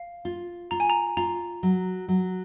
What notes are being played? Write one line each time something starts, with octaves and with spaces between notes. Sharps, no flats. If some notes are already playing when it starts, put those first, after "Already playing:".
Already playing: F5
F4
F4 A#5
G#5
A#5
F4 A#5
F#3
F#3